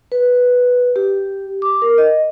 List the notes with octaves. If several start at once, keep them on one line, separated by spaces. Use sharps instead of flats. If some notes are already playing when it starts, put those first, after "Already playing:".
B4
G4
D6
A#4
D#5